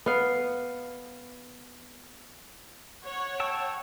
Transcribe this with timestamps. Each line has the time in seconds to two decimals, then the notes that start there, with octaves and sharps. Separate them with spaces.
0.06 B3 F5
3.04 C#5 F#5
3.40 G5 A5 E6